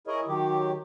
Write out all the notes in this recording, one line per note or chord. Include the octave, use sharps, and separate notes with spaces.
E4 G#4 A#4 C#5 D#5
D#3 F#3 G4